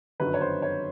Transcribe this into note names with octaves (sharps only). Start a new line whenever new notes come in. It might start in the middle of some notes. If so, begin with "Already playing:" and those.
G1 F#2 D#3 F#3 B4
C#5
C5
C#5